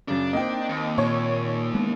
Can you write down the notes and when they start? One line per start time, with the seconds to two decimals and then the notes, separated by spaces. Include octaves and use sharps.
0.08 F#2 C#3 D4
0.33 A#3 C4 D#4 D#5 G5
0.69 D#2
0.98 A#2 C#5
1.74 G#3 B3